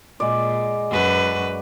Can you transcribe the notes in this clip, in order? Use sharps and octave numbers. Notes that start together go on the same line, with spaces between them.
A#2 G#3 D5
F#2 F#4 B4